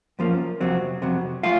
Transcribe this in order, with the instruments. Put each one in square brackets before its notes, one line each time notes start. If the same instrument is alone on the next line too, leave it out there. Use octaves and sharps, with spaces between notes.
[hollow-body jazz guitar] F#2 F3 A#3 C#4
F2 C3 F#3 C4
F2 C3 F#3
A3 F4 F5